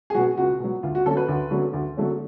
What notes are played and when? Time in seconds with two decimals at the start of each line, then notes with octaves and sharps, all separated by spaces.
0.10 G#4
0.14 B2 F#3 F#4
0.37 C#2 F#4
0.60 B2 F#3
0.83 D2 F4
0.95 F#4
1.06 D3 F#3 A3 C#4 A4
1.17 B4
1.28 D2
1.51 D3 F#3 A3 C#4
1.73 D2
1.97 D3 F#3 A3 C#4